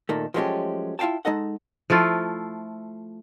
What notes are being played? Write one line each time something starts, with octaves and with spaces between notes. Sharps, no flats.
A#2 D#3 A3
F3 F#3 G#3 A3 C#4 G4
E4 F4 F5 G5 A5
G#3 D#4 A4 D#5 F#5
F3 A3 E4 F4